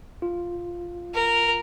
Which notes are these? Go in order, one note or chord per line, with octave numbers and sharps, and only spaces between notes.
F4
A#4